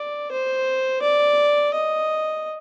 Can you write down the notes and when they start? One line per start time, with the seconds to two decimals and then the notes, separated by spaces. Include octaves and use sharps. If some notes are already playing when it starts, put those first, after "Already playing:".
Already playing: D5
0.32 C5
1.02 D5
1.74 D#5